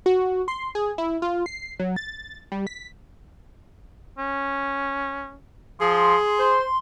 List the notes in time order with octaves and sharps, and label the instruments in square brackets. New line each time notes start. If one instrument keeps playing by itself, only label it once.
[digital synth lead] F#4
C6
G#4
E4
F4
C7
F#3
A6
G3
B6
[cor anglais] C#4
[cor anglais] F3 [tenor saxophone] G#4 [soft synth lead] C6
[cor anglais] C5